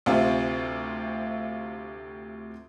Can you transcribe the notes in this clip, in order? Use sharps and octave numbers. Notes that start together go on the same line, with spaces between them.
D2 C3 F4